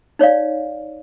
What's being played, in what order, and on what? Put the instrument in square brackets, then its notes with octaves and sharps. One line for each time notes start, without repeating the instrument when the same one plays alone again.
[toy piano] D#4 C#5 D5 F5